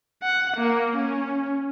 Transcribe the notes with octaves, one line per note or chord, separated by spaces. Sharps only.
F#5
A#3
C#4